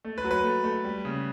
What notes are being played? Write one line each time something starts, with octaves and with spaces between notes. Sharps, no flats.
A3
B4
F#3
B4
A3
A3
G3
C#3